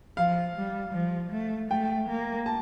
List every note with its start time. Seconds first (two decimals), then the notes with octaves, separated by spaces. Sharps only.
0.17 F3 F5
0.56 G3
0.94 F3
1.32 A3
1.71 A3 G5
2.09 A#3
2.46 A5